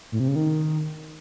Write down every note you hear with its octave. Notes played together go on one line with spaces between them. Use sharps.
A2
C3
C#3
D#3